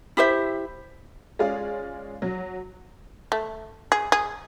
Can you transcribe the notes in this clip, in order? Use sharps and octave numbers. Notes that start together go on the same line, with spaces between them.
E4 G4 C5 E5
G#3 C#4 F4 G#4 D5 F5
F#3
A3
G#4
G#4